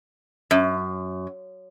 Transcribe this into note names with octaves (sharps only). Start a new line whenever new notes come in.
F#2